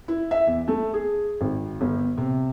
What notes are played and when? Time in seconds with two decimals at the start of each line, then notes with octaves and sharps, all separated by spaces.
0.08 E4
0.31 E5
0.47 E2
0.68 A3
0.94 G#4
1.41 G#1
1.81 G1
2.18 C3